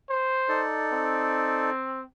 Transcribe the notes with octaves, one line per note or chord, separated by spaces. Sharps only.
C5
D#4 A4 D5
C4